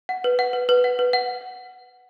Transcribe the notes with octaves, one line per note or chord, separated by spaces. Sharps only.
F#5
B4
F#5
B4
B4
F#5
B4
F#5